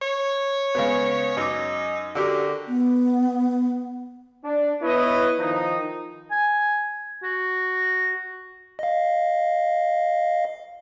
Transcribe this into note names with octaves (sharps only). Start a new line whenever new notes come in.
C#5
C#3 G#3 B3
F#2 D#4 D6
D3 F#4 G4 A#4
B3
D4
B3 E4 B4 C#5 D#5
D#3 F3 D#4
G#5
F#4
D#5 F5